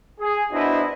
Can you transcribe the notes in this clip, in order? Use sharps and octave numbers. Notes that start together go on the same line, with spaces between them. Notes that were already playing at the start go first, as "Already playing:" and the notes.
G#4
B3 D4 E4 F#4 C5 D#5